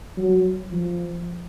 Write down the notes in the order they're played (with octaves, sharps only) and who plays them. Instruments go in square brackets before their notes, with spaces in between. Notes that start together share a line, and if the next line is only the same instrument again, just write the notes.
[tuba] F#3
F3